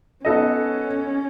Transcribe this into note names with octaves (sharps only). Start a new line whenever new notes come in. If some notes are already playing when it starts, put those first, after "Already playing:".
B3 C#4 D#4 A4 D#5